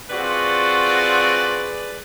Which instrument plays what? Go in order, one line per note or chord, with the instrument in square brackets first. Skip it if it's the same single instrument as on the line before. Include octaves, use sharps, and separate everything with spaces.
[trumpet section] C4 F4 F#4 [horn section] G#4 B4 D5